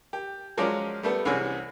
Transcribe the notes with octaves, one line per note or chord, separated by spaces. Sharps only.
G4
F3 F#3 G#3 C#4 F4 D5
G3 A3 B3
C2 C3 E3 C#4 G#4